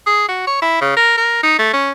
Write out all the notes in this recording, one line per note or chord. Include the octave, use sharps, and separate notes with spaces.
G#4
F#4
C#5
E4
C#3
A#4
A#4
D#4
A3
C#4